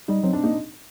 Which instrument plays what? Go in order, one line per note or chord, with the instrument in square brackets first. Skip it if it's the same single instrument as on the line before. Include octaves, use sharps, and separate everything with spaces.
[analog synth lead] G3 [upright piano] D#4
[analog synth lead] F#3 [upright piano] C4
[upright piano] D4
[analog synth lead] A#3 [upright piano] D#4